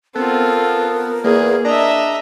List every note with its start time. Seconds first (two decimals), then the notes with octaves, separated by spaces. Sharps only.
0.15 B3 C4 F4 A4 A#4
1.24 E2 A#3 G#4
1.65 D4 D#5 E5 A#5